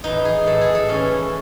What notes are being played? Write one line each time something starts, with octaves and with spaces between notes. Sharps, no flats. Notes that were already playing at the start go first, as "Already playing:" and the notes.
A2 E3 D#4
G#4
A2 E3 A4
G#4
A4
A2 E3 C#4